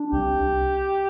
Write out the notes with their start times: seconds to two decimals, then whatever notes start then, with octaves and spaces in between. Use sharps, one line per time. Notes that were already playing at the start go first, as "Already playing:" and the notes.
Already playing: D4
0.12 C2 G4